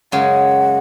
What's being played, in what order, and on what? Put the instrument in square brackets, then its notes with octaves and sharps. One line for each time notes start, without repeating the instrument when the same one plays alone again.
[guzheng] F#2 C#3 G#3 [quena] F#5